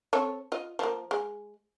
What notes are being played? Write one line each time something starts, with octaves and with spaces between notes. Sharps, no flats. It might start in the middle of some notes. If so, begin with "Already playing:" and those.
C4 A4 C#5
F4 D#5
F3 A#3
G#3